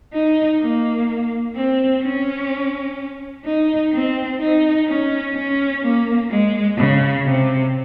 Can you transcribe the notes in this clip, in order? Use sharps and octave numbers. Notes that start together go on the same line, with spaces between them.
D#4
A#3
C4
C#4
D#4
C4
D#4
C#4
C#4
A#3
G#3
C#3
C3